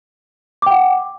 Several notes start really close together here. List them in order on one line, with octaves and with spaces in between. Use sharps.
D6 G5 F#5